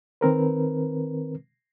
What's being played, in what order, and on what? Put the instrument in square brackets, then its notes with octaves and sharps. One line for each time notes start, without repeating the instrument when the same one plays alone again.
[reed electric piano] D#3 C4 A#4 B4